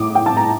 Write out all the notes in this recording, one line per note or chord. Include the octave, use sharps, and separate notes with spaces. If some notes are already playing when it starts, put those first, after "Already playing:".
Already playing: A2 D6 D#6
G5
A5
A#5